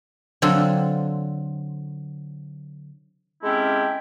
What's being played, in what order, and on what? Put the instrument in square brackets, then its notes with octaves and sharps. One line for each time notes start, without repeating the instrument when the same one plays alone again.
[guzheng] D3 F#3 C4 F4 A4
[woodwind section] G#3 C4 C#4 E4 G4 A4